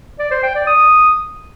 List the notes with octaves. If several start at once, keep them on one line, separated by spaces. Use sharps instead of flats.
D5
C5
G5
D5
D#6